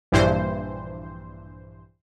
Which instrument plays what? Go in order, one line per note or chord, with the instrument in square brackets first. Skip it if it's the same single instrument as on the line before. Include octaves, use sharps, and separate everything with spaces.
[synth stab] A#1 G2 E3 C5